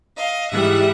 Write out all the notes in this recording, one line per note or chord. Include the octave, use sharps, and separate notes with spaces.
D#5 F5
G#2 E3 G3 E5 F#5